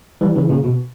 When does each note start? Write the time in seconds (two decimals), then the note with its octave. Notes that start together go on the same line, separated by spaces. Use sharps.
0.21 E3 G3
0.36 C#3 E3
0.49 A#2 C#3
0.64 B2